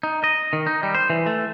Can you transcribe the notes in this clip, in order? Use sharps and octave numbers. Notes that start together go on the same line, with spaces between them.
D#4
D#5
D#3
D#4
G3
C5
E3
A3